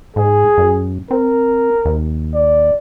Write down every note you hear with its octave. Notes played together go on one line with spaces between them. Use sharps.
G#2 G#4
F#2
C4 A#4
D#2
D5